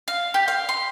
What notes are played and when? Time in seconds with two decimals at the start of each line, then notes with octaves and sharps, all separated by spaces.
0.08 F5
0.34 G4
0.48 F5
0.69 C6